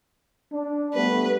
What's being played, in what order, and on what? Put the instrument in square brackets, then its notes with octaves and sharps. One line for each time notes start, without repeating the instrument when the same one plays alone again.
[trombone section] D4
[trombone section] G3 A3 B3 [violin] B4